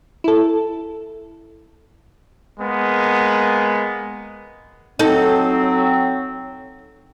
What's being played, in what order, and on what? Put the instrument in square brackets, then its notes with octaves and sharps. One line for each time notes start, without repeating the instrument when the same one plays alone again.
[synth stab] E4 A4
[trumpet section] G#3 A#3 B3
[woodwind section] F#3 C4 [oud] D#4 A4